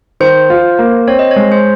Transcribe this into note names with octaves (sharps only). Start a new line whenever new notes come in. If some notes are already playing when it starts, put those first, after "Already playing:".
D#3 C5
F4
A#3
C4 C#5
D#5
C#5
G#3
C5